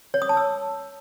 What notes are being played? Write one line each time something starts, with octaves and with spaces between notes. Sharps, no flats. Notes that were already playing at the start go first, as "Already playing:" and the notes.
C#5
D#6
A5
E6